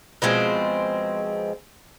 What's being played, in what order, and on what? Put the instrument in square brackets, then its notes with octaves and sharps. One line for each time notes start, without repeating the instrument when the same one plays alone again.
[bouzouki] B2 F3 G#3 C4